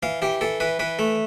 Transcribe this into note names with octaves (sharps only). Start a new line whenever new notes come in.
E3 F5
E3 G4
E3 A4
E3 B4
E3 B4
A3